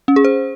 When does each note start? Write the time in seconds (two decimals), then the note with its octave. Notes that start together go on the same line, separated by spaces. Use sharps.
0.08 C#4
0.16 G#4
0.25 C5